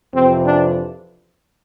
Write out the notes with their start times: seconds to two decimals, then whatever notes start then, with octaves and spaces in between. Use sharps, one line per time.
0.14 F2 C3 E3 C4
0.46 D4